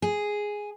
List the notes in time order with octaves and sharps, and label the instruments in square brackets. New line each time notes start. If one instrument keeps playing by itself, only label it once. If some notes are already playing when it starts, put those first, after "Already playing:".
[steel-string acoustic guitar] G#4